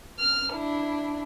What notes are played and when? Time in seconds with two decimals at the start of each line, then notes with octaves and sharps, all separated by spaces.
0.20 F6
0.53 D4 E4